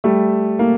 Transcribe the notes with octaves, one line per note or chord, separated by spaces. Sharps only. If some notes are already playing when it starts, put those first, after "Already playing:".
G3 A3
A#3